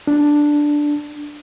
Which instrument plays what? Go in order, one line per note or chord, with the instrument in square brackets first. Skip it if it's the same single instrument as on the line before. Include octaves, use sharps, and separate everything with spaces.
[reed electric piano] D4